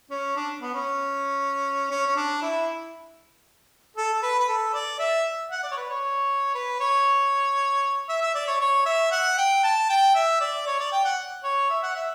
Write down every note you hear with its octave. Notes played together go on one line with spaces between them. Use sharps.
C#4
D4
B3
C#4
C#4
C#4
D4
E4
A4
A4
B4
B4
A4
D5
E5
F#5
D5
C#5
B4
C#5
B4
C#5
E5
E5
D5
C#5
C#5
E5
F#5
G5
A5
G5
E5
D5
C#5
D5
G5
F#5
C#5
E5
F#5
E5